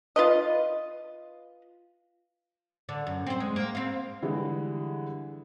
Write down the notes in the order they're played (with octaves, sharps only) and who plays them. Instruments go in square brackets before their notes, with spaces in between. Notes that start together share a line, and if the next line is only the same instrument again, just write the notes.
[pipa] F4 B4 D#5
[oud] D3
F#2
C4 C5
G#3
A#3
C4 F5
[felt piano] D3 E3 G3 G#3